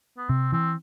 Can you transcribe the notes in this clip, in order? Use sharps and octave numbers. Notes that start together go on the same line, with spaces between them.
B3
C3 C4
E3 C4